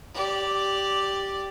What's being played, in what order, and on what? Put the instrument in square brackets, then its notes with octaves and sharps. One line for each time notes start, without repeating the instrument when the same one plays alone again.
[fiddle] G4 D5